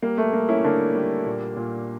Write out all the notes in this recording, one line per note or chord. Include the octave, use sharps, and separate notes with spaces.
G3 A#3
A3
G3 A#3
C#4 E4
D3 A#3 D4
G3
A#2
A#2